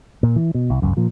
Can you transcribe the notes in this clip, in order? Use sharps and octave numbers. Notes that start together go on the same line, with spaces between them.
A#2
E3
B2
C2
G1 C#2 F#2
A#2 F3